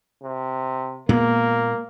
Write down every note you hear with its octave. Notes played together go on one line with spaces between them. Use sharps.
C3
A#2 G#3 A#3 B3